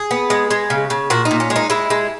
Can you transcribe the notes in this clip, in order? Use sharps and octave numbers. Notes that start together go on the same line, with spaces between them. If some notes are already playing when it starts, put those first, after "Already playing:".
Already playing: G#4
B3
G#3
G#3
C#3
C#3
A#2 F#4
D#4
A#2
C#4
G#3
D#4
G#3 E4
G#3